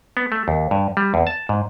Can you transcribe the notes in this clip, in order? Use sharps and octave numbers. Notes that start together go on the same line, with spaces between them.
B3
A3
D#2
G2
G3
E2
A5
G#2